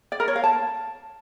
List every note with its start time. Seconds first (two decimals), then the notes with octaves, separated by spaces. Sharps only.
0.12 D5
0.20 A#4
0.28 C#5
0.36 F5
0.44 A5